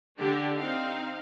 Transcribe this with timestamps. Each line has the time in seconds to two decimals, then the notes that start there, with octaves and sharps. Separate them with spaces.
0.18 D3 D4 G4
0.57 C4 D#4 F5